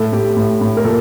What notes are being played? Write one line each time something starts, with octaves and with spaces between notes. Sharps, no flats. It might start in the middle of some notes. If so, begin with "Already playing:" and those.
Already playing: A2 A4
A2 G4
A2
A2
A#4
A#2 A4